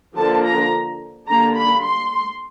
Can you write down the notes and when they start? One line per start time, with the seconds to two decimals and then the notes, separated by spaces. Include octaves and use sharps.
0.17 D3 F3 A#3 D4 A5
0.45 A#5
1.28 D3 G3 A#3 D4 A#5
1.56 B5
1.85 C6